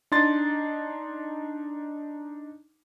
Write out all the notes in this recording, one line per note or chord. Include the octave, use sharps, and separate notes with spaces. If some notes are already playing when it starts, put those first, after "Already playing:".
D4 D#4 C6 A6